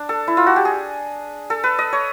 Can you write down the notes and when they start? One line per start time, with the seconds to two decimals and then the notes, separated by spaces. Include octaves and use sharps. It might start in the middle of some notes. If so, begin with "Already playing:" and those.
Already playing: D4
0.09 A4
0.28 E4
0.37 F4
0.46 F#4
0.56 G4
0.65 G#4
1.50 A4
1.64 B4
1.79 D#5
1.92 C#5